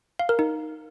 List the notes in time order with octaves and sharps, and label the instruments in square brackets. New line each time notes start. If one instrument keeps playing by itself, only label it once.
[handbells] F5
A#4
D#4